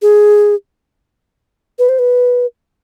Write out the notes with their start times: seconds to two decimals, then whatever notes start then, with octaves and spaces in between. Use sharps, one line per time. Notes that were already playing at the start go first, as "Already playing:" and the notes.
0.02 G#4
1.79 B4
1.89 C5
1.99 B4